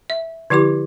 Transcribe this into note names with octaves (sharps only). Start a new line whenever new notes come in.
E5
D3 F3 E4 G4 D6